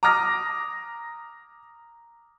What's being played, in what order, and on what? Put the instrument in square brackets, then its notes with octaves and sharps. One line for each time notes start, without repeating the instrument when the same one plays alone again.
[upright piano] A#5 D6 D#6 F6 A#6